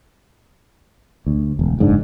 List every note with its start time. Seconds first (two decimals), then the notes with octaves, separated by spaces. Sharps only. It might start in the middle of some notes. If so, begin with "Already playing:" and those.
1.26 D2
1.59 E1
1.79 F#1 G#2 D4